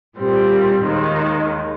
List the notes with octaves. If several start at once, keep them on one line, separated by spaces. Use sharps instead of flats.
A#2 G3 C4
D#2 D#3 G#3